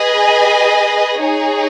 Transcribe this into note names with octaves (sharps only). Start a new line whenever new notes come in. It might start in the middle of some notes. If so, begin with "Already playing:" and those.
Already playing: G#4 B4 D#5 G#5
D#4 G#4 C#5